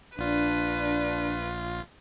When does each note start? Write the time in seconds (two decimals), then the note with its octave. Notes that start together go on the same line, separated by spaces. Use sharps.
0.18 A#1 D4 F4 B4